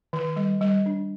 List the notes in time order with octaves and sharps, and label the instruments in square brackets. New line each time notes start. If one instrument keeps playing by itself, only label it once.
[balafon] D#3
G3
G3
D4